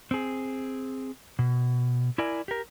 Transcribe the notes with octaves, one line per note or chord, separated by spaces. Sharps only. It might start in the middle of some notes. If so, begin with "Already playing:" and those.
C4 G#4
B2
E4 A#4 D5 G#5
G4 A#4